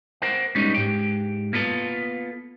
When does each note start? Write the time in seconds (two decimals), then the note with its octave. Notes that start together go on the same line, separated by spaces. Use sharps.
0.22 A#4 C5 F#5
0.55 G3 G#3 B3 C#4 D#4
0.74 G#2 G4
1.53 A#3 B3 F4 A4